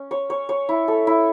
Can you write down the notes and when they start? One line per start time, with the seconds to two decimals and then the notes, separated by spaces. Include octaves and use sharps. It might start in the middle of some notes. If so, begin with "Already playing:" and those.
Already playing: C#4
0.11 C#5
0.30 C#5
0.49 C#5
0.69 E4
0.88 A4
1.07 E4